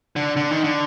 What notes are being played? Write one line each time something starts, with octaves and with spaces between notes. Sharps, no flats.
D3
D3
D#3
D3